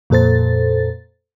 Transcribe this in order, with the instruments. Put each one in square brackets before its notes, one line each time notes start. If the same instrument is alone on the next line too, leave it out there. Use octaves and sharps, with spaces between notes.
[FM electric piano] F2 A#2 A4 C5 A6